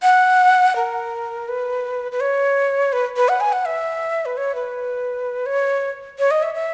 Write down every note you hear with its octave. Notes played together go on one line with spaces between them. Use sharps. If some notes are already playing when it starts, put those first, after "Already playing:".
F#5
A#4
B4
B4
C#5
B4
B4
F#5
G#5
F#5
E5
B4
C#5
B4
C#5
C#5
D#5
E5
E5